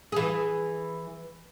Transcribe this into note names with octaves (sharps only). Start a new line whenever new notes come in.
E3 G#4